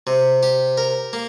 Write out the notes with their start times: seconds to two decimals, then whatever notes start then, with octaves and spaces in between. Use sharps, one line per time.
0.07 C3
0.43 G4
0.77 A#4
1.13 A#3